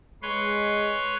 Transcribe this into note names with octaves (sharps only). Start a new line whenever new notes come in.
G#3 B4 C#5 C6